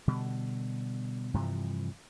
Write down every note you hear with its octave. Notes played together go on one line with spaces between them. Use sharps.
B2 D3 G3
G2 C3 E3 F3